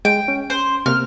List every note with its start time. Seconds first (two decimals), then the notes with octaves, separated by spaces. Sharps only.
0.05 G#3 G5
0.28 C#4
0.50 C5
0.86 C3 A#3 F6